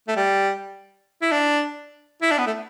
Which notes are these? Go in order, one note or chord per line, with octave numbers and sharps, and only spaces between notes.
A3
G3
E4
D4
E4
D4
B3
A3